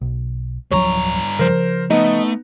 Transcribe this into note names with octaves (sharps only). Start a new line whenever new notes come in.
B1
D1 G2 F3 F#3 C#5 A#5
C#3 F3 A#4 C5
A3 B3 D#4 D#5